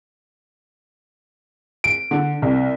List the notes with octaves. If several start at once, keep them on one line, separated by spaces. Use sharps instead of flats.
D7
D3
C2